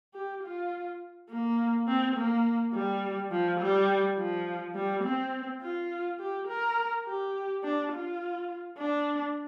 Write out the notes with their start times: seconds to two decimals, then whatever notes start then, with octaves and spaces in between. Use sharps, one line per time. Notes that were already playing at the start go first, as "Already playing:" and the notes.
0.14 G4
0.43 F4
1.29 A#3
1.87 C4
2.16 A#3
2.73 G3
3.31 F3
3.60 G3
4.17 F3
4.75 G3
5.03 C4
5.62 F4
6.19 G4
6.48 A#4
7.06 G4
7.63 D4
7.92 F4
8.78 D4